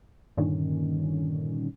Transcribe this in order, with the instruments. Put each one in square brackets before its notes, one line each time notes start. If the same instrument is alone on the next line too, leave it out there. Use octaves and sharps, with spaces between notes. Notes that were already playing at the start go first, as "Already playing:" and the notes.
[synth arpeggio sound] G2 A#2 D3 D#3 C#4